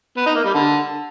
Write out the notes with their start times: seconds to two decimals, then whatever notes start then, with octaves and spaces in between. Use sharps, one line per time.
0.17 B3
0.26 D#4
0.36 A#3
0.45 G3
0.54 D3